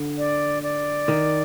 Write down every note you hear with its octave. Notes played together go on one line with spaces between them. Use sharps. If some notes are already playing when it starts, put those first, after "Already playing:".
Already playing: D3
D5
D5
D#3